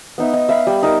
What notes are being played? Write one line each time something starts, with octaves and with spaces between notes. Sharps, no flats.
B3 D#4 E5
D#4
E5 F5 B5
G3
D#4 A#4 D6